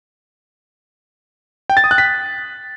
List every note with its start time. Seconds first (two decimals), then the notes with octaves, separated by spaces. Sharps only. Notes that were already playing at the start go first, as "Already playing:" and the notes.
1.70 G5
1.77 A6
1.84 D#6
1.91 F#6
1.98 B6